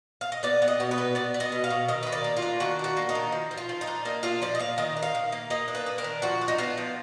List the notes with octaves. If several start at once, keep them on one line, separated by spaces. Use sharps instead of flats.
F5
D#5
B3 D5
B3
D#5
B2
B4
B3
B3 D5
B3
D#5
B2
F5
B2
D#3 D#5
D#3 B4
D5
A#3
F4
D4
D#3 F#4
D4 F#4
A#3
D#4
D#3
F3
F3
F4
F3
D#4
D4
A#3 D#4
D4 F4
F3 D5
D#5
A#3 F5
D#3 D#5
D4
F5
D#3
A#3
A#3 D#5
D4
B4
D4
A#4
D#3
F3 F#4
D4
D#4
B3 F4
F3